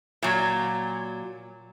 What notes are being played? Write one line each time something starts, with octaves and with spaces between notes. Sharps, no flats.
A#2 F#3